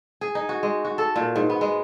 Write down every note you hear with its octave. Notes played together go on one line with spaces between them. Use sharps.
G#4
D#4
F#4
G#3
F#4
A4
A#2
G#2
B3
G#3